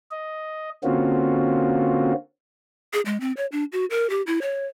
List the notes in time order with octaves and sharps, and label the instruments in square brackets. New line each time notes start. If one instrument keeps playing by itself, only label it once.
[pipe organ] D#5
D3 A#3 C4 C#4 F4 F#4
[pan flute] G#4
G#3
C4
C#5
D4
F#4
A#4
G4
E4
C#5